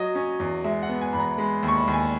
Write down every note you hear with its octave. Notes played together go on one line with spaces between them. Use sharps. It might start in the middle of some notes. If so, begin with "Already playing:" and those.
Already playing: F#3 D#5
C#4
E2
G#3 E5
F#5
B3
G#5
E2 B5
A#5
G#3 B5
D#2
C#6
B5
D#2
G#5